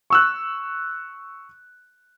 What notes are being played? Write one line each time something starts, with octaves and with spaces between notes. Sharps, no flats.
C#6 E6 F#6